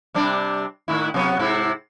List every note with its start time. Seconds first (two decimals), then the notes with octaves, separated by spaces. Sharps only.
0.14 C3 G3 D4
0.88 A2 D#3 E4
1.14 C3 F#3 B3
1.39 G#2 C3 E4